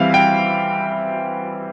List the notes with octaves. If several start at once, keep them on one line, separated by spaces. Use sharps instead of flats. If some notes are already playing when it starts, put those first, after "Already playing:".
Already playing: E3 G3 C4 E4 F5
G5